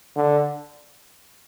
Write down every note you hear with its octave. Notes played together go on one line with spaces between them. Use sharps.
D3